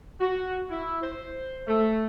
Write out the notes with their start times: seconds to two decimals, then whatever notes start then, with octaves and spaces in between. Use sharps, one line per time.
0.20 F#4
0.70 E4
1.02 C5
1.67 A3